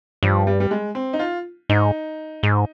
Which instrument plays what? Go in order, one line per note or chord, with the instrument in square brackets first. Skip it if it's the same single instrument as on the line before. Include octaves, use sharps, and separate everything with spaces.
[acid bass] G2 [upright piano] F3
[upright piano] G3
G3
G#3
C4
D#4
F4
[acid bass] G#2 [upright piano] D#4
[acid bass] G#2